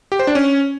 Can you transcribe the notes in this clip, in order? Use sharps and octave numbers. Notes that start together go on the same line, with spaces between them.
G4
C5
D4
C#4